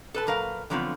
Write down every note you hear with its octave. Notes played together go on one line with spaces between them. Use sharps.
A4 B4 A5
A#2 F#3 A#4 B4 F5
D3 F3 F#3 B3 C4 F4